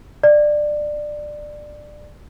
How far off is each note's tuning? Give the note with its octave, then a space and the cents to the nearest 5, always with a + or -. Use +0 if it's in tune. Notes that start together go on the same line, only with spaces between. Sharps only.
D5 +15